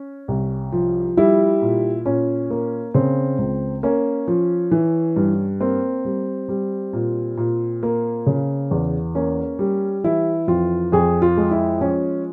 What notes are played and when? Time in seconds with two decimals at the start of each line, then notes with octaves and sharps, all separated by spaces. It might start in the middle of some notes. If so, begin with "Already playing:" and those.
Already playing: C#4
0.28 C2
0.72 F3
1.17 G3 E4
1.62 A#2
2.06 A#2 C#4
2.50 A#3
2.94 C#3 C4
3.38 C#2
3.83 A#3 C#4
4.28 F3
4.71 E3
5.16 G2
5.61 A#3 C4
6.05 G3
6.49 G3
6.93 A#2
7.37 A#2
7.83 A#3
8.26 C#3
8.71 E2
9.15 A#3 C#4
9.59 G3
10.04 E3 E4
10.48 F2 F4
10.92 F2 G#4
11.22 F4
11.37 G#3
11.51 E4
11.81 F3 C#4